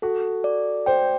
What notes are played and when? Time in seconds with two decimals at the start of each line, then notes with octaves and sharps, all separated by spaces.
0.02 F#4 A4
0.44 D5
0.86 C5 G5